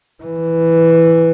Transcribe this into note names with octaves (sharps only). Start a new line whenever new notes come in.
E3